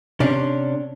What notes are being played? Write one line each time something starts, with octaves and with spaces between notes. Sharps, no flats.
C3 C#4 D4